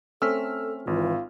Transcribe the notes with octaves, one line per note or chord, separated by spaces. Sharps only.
A3 C4 C#4 A4 E6 F6 B6
G#1 E3 F4